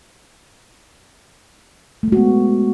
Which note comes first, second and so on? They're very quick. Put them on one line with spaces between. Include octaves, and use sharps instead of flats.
A3 G#3 F#4 B3